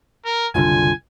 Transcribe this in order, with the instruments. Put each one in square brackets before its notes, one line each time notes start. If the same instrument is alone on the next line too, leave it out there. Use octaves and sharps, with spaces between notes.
[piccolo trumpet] A#4
[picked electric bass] F#1 C2 D3 [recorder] F4 [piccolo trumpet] G#5